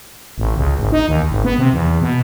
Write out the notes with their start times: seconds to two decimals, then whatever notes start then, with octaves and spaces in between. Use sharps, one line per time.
0.38 A1
0.56 C#2
0.79 G#1
0.92 D#4
1.08 D#2
1.30 G#1
1.45 B3
1.58 C3
1.73 E2
2.01 B2